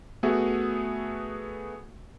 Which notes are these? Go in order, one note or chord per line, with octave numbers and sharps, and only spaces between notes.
A3 B3 F#4 G#4 E5